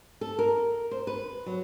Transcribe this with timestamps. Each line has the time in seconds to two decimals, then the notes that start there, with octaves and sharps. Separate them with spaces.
0.21 A4
0.39 A#4
0.91 C5
1.07 B4
1.46 F#3